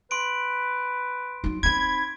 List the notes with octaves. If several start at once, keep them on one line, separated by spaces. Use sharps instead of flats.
B4 C6 D7
F#3 D#4
C4 D#4 B5 G#6